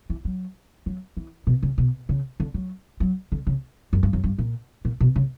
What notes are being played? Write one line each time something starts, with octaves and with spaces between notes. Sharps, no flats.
E3
F#3
F#3
E3
B2
C#3
B2
C#3
D3
F#3
F#3
D3
C#3
F#2
G2
F#2
G2
A#2
A#2
B2
C#3